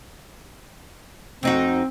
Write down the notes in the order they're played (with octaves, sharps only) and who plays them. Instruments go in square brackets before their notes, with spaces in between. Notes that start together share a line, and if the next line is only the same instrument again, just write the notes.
[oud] F2 D#4 F#4 [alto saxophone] C4